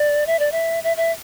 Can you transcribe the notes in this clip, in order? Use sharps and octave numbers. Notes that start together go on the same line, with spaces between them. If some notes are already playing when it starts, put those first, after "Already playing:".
Already playing: D5
E5
D5
E5
E5
E5